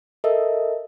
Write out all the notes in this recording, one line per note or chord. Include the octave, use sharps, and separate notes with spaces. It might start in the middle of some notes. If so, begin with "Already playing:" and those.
A4 A#4 D#5 E5